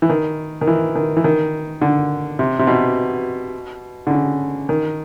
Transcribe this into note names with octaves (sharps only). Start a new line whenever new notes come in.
E3
D#3
D#3
E3
D#3
E3
D#3
D3
C3
C3
B2
D3
C#3
D#3